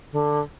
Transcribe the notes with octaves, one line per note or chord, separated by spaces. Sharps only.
D3